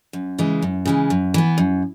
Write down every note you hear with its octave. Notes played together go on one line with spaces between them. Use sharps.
F#2
C#3 E3 G#3
F#2
C#3 E3 G#3
F#2
E3 B3
F#2